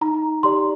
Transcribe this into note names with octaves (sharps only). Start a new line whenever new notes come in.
D#4 A#5
G4 D5 C6